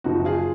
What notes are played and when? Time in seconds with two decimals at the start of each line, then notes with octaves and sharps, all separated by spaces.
0.04 F#1 F#2 F3 D#4 F#4
0.25 F4 G#4